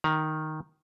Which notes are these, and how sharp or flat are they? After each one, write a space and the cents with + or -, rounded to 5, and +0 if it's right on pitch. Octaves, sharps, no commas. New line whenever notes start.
D#3 +0 A#5 +30